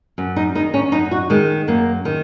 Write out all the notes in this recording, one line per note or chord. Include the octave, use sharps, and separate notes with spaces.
F#2
D#4
D#3 D#4
C#4
F#2 D#4
F#4
D#3 G#3
F#2 A#3
D#3